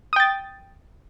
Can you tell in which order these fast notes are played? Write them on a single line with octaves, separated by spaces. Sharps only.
D#6 G5 A6